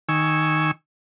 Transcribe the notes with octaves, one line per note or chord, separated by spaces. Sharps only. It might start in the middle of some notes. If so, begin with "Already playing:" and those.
D#3 G#5 C#6 E6